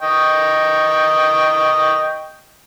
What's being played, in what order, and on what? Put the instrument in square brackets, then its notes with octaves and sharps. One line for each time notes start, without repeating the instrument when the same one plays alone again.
[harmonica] D#5 G5 C#6